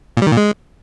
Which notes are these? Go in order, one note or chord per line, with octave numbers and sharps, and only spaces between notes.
A#2
G3
D#3
A#2
G#3